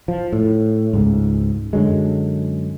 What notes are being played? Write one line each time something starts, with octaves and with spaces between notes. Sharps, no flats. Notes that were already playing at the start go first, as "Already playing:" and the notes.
F3
A2
C#2 G#2
F#2 D3 F#3 G#3